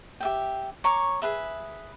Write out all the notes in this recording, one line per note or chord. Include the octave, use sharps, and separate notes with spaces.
G4 E5 G5
C#5 A#5 C#6 D6
G#4 B4 E5